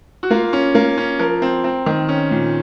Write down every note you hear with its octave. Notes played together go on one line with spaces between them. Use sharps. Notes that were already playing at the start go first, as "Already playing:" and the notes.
F#4
A#3 F4
C#4
A#3
C#4
F3 A#4
C4
C4
D#3
C#4
A#2